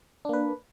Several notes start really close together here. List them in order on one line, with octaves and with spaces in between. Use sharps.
D4 A#3 B4